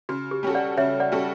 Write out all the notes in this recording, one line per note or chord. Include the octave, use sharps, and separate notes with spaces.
C#3 F#4
G4
G3 C#4 F#4 A4
D5 F#5
C#3 C#5 E5
D5 F#5
G3 C#4 F#4 A4